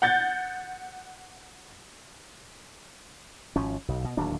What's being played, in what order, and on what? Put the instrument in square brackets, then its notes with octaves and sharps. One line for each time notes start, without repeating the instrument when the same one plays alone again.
[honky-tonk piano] F#5 G6 A6
[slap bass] G#1 F3 C#4
B1
B2
D1 D#2 F#3 D4